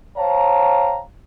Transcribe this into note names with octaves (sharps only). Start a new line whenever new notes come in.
C5 C#5 F5 G5 A5 A#5